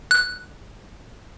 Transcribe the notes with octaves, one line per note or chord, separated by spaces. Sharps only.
F#6